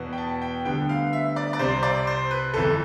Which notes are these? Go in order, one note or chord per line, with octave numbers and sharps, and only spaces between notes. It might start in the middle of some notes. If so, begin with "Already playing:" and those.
Already playing: E2 B2 B3
G5
A5
G5
D2 D3 G3 B3 G5
F5
E5
D5
D5
C2 C3 G3 C4 C5
D5
C5
B4
G1 F2 E3 A4